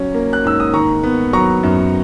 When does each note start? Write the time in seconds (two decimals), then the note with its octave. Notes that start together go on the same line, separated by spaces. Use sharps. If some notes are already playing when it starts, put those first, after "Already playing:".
Already playing: F#3 C#4
0.14 A#3
0.33 F#6
0.44 G#2 E6
0.60 D#6
0.73 D#3 A#5 C#6
1.03 B3
1.33 F#3 A#5 C#6
1.63 F#2